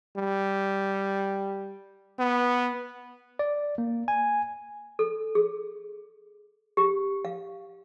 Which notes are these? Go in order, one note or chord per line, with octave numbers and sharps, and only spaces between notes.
G3
B3
D5
A#3
G#5
A4
G#4
G4
F5